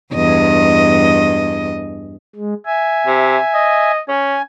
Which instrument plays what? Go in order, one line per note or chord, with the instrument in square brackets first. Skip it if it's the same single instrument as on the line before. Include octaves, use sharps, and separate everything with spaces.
[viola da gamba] E2 G2 D#5
[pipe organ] G#3
E5 G#5
[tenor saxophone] C3
D#5
[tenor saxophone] C#4 [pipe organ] G#5